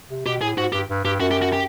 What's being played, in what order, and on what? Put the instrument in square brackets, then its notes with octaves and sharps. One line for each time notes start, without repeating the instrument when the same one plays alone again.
[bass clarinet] C3
[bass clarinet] B2 [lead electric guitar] G4
[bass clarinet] A2 [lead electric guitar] G#4
[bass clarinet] G#2 [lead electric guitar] F#4
[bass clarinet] G2 [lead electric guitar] G4
[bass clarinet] G2
[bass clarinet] G2 [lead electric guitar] G4
[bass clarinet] F#2 [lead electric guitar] F#4
[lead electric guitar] G4
F#4
G4